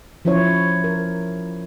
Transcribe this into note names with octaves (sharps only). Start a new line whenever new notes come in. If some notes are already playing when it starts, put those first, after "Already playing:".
F3 C#4 E4 C5 C#5
A#4